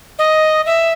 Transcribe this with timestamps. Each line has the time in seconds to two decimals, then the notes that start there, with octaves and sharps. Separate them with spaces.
0.19 D#5
0.66 E5